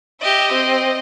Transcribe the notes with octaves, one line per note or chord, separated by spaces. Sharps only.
G4 D#5 E5
C4